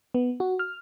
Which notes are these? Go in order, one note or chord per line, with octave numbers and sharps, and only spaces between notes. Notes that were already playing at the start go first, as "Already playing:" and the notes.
B3
F#4
F6